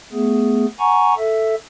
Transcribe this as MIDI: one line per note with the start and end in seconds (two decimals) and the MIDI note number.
0.13 0.66 57
0.13 0.66 59
0.13 0.66 68
0.79 1.14 78
0.79 1.14 80
0.79 1.14 82
0.79 1.14 85
1.17 1.55 69
1.17 1.55 76